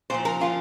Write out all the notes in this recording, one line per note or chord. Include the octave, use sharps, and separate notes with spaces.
A#2 F3 C5
A#4
A#2 F3 F4